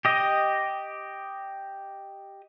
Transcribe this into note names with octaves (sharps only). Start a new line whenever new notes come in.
G4 D#5